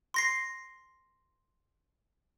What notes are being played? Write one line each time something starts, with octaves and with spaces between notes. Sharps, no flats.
C6 A#6 C7